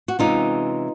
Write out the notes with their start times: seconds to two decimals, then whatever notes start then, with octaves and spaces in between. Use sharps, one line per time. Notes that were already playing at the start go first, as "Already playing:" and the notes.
0.08 F#4
0.19 C3 E3 G#3 C#4 D#4 F4